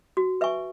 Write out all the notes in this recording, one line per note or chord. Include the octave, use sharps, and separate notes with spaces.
F#4
B4 E5 G#5 C#6